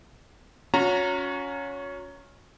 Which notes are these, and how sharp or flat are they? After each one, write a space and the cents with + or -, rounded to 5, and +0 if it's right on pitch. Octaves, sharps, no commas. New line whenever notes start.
C#4 +15 F#4 -35 A#5 -15